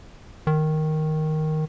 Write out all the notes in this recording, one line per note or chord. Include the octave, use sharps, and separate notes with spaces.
D#3